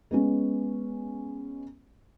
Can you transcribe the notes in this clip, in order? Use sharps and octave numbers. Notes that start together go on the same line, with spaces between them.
G#3 B3 C#4